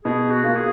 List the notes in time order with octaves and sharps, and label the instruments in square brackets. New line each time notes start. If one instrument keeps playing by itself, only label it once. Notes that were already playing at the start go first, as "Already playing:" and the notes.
[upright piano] B2 [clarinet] G#4
[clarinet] F#4
[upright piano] A#3 F4
[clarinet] G#4